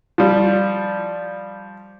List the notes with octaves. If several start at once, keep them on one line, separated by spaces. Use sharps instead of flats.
F3 G3